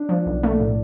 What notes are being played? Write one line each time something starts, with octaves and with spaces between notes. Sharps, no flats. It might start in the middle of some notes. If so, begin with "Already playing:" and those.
Already playing: D4
F3
B1
A3
A2